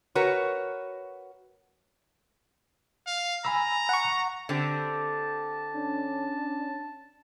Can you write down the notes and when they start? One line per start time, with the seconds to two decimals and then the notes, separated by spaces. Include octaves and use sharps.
0.15 F#4 A#4 B4 C#5
3.07 F5
3.45 G#5 A#5 B5 E6
3.89 F#5 C#6
4.49 D3 C4 G4 A5
5.76 C#4 D4